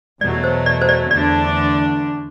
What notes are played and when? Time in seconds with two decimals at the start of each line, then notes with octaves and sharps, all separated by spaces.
0.21 E2 B2 F#3 A3 D5
0.44 C5
0.66 D5
0.81 C5
0.89 D5
1.11 E2 D3 A3 D4 D5